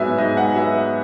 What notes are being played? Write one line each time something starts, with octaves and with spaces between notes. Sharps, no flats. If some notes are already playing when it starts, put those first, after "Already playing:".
Already playing: G#2 F#3 B3 E5 G#5
G#2 D#5
F#5
F#3 B3 E5